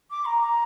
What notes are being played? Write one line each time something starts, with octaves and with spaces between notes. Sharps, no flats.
D6
A#5
A#5